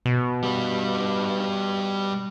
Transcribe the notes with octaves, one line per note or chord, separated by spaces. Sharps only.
B2
G3 B4